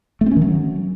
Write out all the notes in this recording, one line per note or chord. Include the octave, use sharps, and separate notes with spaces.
A3
C4
C#4
D#3
F#3